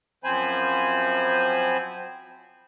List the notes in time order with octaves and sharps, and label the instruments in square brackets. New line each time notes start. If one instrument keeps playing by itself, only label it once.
[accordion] F#2 F3 C4 C5 G#5 B5